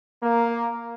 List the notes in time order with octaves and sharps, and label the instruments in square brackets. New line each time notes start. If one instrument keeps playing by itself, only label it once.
[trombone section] A#3